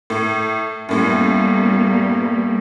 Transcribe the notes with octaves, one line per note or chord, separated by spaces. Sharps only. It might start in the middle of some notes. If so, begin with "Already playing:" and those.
A2
F#2 A2 G3 A#3 B3